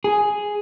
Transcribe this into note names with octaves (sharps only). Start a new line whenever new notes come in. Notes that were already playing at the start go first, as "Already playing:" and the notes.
G#4